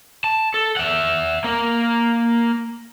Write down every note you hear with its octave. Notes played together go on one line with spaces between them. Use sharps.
A5
A4
E5 F#5
A#3 A#4